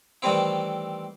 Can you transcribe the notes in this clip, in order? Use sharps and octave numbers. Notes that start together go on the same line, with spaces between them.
D#3 E3 G3 A3 C4 E4